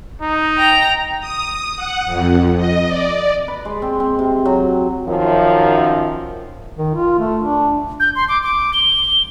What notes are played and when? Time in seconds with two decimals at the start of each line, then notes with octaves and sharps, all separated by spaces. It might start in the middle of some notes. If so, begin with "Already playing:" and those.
0.22 D#4
0.58 G5 A#5
1.20 D#6
1.76 F#5
2.06 F2
2.57 D#5
2.88 D5
3.48 B4
3.65 G#3
3.82 C4
4.00 C4
4.19 C3
4.45 F#3
5.08 F#2 D#3 F3
6.78 D#3
6.95 F4
7.19 A3
7.42 D4
8.00 G6
8.15 C6
8.28 D6
8.43 D6
8.73 G7